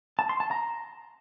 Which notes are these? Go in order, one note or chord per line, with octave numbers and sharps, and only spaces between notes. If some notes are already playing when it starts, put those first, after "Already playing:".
A5
C6
A5
A#5